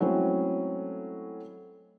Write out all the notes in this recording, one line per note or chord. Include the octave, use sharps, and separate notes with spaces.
F#3 G#3 A3 C4 C#4 E4